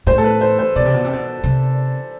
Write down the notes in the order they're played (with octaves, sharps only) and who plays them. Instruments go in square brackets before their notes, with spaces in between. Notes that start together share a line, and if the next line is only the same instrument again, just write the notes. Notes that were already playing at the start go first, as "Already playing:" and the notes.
[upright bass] A2 [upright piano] C5
[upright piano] A4
B4
C5
C5
[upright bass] B2 [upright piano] D5
[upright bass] C3
B2
C3
B2
C3